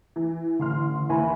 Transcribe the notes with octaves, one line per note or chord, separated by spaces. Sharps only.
E3
A1 D3 C6 F6
D#2 E3 E5 G#5 B5